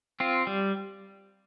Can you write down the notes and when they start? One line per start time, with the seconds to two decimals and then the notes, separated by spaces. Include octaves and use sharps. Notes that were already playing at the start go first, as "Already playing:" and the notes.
0.20 C4 F4
0.47 G3